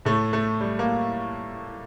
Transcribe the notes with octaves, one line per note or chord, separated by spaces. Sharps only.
A2 A3
A3
G3
A#3